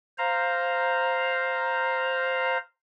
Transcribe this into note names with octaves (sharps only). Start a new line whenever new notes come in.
C5 F5 A#5